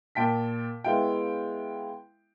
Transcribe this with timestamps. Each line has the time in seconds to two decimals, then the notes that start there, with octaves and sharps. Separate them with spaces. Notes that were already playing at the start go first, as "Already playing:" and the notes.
0.15 A#2 G5 A5 B6
0.84 G#3 B3 E4 E5 F5 G5